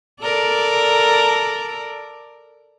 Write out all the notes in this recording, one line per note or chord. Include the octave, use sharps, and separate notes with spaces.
A4 A#4 D5